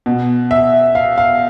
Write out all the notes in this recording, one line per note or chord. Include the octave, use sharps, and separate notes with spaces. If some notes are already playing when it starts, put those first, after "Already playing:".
B2
E5
F5
F5